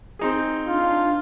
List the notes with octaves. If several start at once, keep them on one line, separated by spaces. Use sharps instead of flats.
C4 D#4 G#4
D4 F4